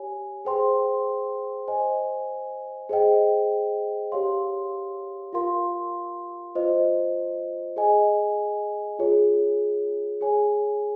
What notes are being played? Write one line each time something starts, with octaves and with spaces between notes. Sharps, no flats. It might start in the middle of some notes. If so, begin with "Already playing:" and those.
Already playing: G4 C#5 G#5
G#4 C5 G5 C6
C5 D#5 G#5
G#4 C5 D#5 G5
G4 C#5 F5 C6
F4 A#4 F5 C6
F4 C5 D#5
G#4 D#5 G#5
F4 G#4 C#5
G#4 C#5 G#5